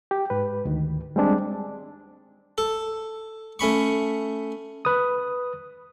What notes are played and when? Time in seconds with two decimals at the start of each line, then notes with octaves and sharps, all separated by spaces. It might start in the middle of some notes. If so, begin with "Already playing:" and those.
0.11 G4
0.30 G#2 B4
0.65 D2 D#3
1.16 G3 G#3 C4 D4 G#4
2.58 A4
3.59 A3 C#4 B5 C#6
4.85 B4 D#6